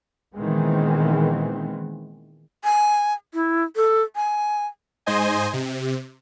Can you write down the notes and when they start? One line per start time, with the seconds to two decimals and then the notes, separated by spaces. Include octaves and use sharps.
0.36 A#2 D#3 E3 G#3 B3 C4
2.64 G#5
3.34 E4
3.76 A4
4.16 G#5
5.06 G#2 C5 D#5 G#5
5.53 C3